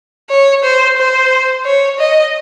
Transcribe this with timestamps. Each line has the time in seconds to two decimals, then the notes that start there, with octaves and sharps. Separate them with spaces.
0.30 C#5
0.64 C5
0.97 C5
1.65 C#5
1.99 D#5